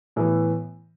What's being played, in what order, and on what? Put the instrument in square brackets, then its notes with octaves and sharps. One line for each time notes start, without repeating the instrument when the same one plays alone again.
[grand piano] A2 E3 B3